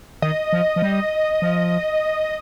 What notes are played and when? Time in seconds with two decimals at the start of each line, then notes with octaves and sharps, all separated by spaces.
0.22 D#3 D#5
0.53 F3
0.76 F3
0.82 G3
1.42 F3